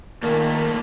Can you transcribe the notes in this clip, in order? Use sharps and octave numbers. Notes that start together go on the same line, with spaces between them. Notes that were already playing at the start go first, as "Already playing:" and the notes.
A#2 D#3 A3 A#3 A#4